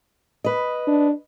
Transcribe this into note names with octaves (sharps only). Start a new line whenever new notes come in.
B4 D#5
D4